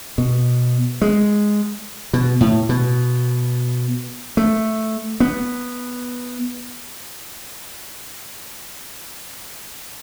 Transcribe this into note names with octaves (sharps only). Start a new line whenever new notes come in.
B2
G#3
B2
A2
B2
A3
B3